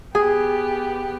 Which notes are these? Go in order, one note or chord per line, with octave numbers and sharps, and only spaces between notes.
B3 G4 G#4